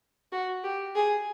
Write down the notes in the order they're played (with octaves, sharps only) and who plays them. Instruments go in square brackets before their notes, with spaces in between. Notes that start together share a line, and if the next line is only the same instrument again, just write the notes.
[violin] F#4
G4
G#4